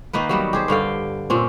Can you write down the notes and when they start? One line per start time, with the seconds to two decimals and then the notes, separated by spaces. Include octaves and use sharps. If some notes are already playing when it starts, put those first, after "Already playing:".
0.13 D#3 A#3 D#4 B4
0.29 F#3 G3 B3
0.53 G4 G#4 C5
0.68 G2 D3 F5 G5
1.30 A#2 C4 C#4